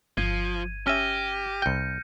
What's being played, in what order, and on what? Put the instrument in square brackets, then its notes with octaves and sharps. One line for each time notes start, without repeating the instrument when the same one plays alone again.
[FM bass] G1 [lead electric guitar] F3 [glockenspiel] G#6 D#7
[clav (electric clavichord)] C#4 E5 [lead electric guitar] G4 [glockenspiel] F6 A#6 D#7
[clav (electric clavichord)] C2 G5 [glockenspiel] G6 C#7